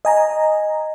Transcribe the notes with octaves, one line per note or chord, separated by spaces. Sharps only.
D#5 G#5 A#5